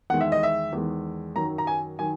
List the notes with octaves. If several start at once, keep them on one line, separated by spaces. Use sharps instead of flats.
E2 D#3 G#3 F#5
E5
D#5
E5
E2 D#3 G#3
F#2 D#3 F#3 A#5
A#5
G#5
D#3 F#3 G#5